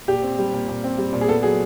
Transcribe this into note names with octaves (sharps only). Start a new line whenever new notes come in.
A#2 G4
C4
G3
A#2
A#2
C4
G3
A#2
G#4
B3 A4
F#3 G#4